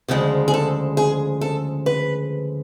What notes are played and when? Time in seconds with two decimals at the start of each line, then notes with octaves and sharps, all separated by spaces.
0.08 D2 C#3 F3 G#3
0.48 G#4
0.54 A4
0.97 G#4
1.41 A4
1.86 B4